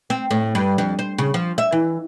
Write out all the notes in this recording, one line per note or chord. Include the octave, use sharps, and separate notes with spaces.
C4
A2
G2
F2
C5
C#3
F3
E5
E3